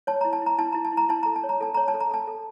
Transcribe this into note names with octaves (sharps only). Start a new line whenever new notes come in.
C#5 A5
E4 A#5
A5
E4 A#5
E4 A5
E4 A#5
A5
E4
A#5
E4 A5
A4 A#5
A5
C#5
A#5
A4 A5
C#5 A#5
A5
A4
A#5
A4 A5
A4